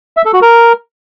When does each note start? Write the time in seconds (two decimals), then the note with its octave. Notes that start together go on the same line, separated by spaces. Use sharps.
0.17 E5
0.25 A4
0.33 F#4
0.42 A#4